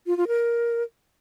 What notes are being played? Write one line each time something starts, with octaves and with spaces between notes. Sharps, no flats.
F4
F4
A#4